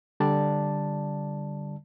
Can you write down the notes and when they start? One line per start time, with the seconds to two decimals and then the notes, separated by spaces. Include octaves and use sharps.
0.20 D3 G3 D5 A5